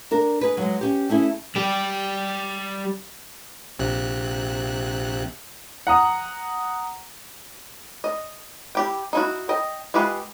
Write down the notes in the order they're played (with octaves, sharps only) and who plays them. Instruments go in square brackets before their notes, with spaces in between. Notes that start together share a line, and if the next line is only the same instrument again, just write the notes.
[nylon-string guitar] D4 A#4
G#4 B4
F#3 G#3
C#4 G4
A3 C#4 E4 G#4
[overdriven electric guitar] G3 G4
[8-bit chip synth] A#1 C3 F#6
[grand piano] F#5 A#5 D#6
[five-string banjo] D#5
E4 G4 G5
D#4 E4 F#4
D#5 G5
G#3 F4 G4 B4 F#5